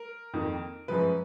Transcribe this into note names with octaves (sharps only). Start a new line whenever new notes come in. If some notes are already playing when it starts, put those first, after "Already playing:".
Already playing: A#4
F2 D#3 A#3
F#2 F3 G#3 B4